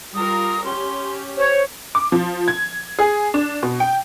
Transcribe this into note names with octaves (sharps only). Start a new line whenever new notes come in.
G3 F4 A#4 D#6
C#4 G4 C6
C5 C#5
D6
F3
G#6
G#4
D4
B2
G5